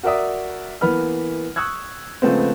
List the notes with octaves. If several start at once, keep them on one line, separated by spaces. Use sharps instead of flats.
F#4 A#4 D5 E5 D#6
E3 A#3 B3 B5 F6
C#6 D#6 E6 F#6 G#6
C#3 F3 G#3 A3 B3 C4